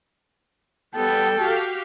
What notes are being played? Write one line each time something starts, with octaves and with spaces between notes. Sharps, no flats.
G3 B3 A4 G5
F#4 G4 F5